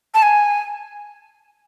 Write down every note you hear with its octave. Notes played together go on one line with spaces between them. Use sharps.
A5
G#5